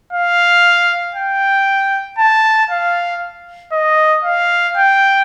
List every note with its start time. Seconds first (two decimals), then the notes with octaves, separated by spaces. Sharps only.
0.13 F5
1.15 G5
2.18 A5
2.71 F5
3.73 D#5
4.24 F5
4.77 G5